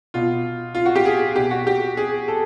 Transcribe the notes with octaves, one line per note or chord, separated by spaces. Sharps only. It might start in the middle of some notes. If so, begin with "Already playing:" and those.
B2 F4
F4
F#4
G4
G#4
B2 G4
F#4
G4
G#4
A4